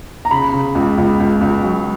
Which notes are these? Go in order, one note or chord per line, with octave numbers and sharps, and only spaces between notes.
A#5
C#3 B5
C#3
C#2
C#2
C#2
C#2
F#3